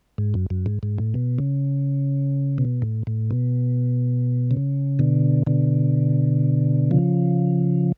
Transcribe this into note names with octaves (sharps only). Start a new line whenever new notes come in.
G#2
F#2
F#2
G#2
G#2
A2
B2
C#3
B2
A2
A2
B2
C#3
B2 D3
B2 D3
C#3 F3